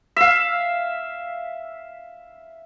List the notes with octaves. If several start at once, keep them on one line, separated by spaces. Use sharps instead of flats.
E5 F5